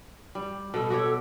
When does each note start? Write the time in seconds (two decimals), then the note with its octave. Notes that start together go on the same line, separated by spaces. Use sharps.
0.35 G3
0.74 B2 A4
0.90 F#4 G4 C#5